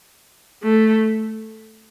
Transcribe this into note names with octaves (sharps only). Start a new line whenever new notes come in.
A3